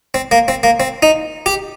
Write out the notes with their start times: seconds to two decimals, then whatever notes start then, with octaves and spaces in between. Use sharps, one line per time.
0.14 C4
0.31 A#3
0.48 C4
0.63 A#3
0.80 C4
1.02 D#4
1.46 G4